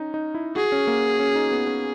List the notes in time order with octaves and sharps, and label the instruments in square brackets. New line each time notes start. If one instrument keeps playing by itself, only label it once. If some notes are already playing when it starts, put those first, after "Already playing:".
Already playing: [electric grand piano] C#4 D#4
D#4
E4
[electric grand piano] F#4 [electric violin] G#4
[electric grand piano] C#4
A#3
C#4
D#4
B3
C#4